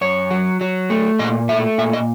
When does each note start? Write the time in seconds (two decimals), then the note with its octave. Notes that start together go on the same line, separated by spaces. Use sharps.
0.01 F#2 C#5
0.31 F#3
0.61 F#3
0.90 A3
1.19 A#2 D#5
1.49 A3 E5
1.78 A#2 E5
1.93 D#5